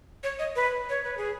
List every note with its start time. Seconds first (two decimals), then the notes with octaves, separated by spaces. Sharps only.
0.24 C#5
0.39 D#5
0.56 B4
0.90 C#5
1.04 B4
1.17 G#4